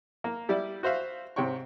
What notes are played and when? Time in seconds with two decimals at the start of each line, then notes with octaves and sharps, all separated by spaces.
0.24 A#3
0.49 G3 E4 D5
0.83 F#4 C5 E5 F5
1.36 G#2 C3 C#5 G5 C#6